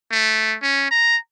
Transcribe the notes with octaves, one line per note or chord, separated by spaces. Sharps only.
A3
C#4
A#5